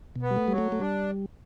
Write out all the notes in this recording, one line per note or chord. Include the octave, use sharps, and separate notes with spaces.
B2
B3
G3
A3
F#3 G3
A3
A3
G3 D4